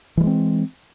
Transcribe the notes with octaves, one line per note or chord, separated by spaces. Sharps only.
E3 G3 G#3 C4